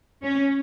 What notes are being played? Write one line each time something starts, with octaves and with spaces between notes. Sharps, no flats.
C#4